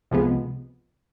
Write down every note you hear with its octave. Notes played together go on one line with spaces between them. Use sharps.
C2 C3 F3 G#3 B3